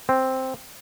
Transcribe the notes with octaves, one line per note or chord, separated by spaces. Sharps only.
C4